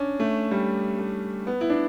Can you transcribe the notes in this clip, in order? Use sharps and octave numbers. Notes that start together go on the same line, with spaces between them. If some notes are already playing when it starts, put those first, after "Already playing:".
Already playing: C#4 D4
A3
G3
A3
B3
E4
D4